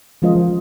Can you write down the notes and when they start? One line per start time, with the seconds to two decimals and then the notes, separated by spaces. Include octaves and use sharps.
0.22 F3 G#3 C#4 F4 A#4 D#5
0.35 F3